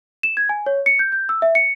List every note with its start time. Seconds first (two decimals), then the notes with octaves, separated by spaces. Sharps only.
0.23 E7
0.37 G#6
0.49 G#5
0.66 C#5
0.86 C#7
0.99 G6
1.12 G6
1.29 E6
1.42 E5
1.55 C#7